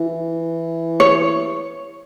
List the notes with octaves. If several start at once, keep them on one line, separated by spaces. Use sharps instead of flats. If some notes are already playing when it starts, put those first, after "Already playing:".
Already playing: E3
C#5